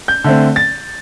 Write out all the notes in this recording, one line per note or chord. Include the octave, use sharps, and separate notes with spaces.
G6
D3 A3 C4
A6